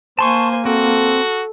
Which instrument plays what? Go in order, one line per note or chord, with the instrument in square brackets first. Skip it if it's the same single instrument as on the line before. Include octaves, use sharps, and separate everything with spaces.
[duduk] A#3 [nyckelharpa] C5 G#5 [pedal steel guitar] A5 C6 C#6
[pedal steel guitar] C4 [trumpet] F#4 [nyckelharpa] A4